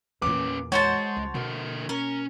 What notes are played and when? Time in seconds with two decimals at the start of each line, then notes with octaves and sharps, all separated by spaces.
0.22 E2 A#2 C#4 B4 D6
0.72 G#3 F#4 C5 C#5 A5
1.17 C#2
1.35 B2 D3 A#3 A#4
1.89 C#4 A#4